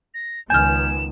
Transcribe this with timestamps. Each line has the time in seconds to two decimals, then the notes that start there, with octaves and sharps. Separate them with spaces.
0.14 A#6
0.50 C#2 D#3 B3 G#5 F6 G6 E7